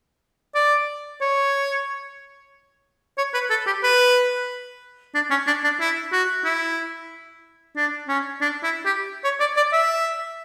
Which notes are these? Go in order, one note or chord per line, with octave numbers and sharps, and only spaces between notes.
D5
C#5
C#5
B4
A4
G4
B4
D4
C#4
D4
D4
E4
F#4
E4
D4
C#4
D4
E4
G4
C#5
D5
D5
E5